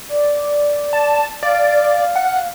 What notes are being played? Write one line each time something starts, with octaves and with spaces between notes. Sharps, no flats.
D5
A5
D5 F5
F#5